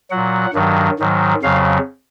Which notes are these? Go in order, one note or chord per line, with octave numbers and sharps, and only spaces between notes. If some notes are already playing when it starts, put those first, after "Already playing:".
A#2 F#3 F#5
G2 D#3 F#3
G#2 D#3 F#3
F2 C#3 F#3 F5